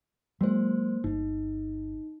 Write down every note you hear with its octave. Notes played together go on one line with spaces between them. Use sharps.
F#3 G#3 A#3 C5
G1 D#4